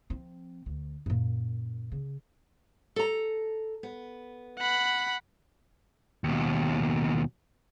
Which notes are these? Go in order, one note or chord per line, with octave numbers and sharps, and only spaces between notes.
F3 C4
D2
F#2 A#2
C#3
A4 A#5
B3
F#5 B5
D#2 B2